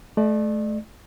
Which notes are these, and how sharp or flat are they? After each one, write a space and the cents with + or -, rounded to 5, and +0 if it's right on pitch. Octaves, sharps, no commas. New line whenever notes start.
A3 -30 D5 +30